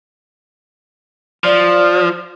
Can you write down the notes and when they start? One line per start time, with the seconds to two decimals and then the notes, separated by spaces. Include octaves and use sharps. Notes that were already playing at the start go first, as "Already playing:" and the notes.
1.44 F3 D5